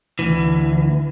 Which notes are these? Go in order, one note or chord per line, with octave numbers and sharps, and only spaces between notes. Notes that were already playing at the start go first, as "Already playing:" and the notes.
D2 E3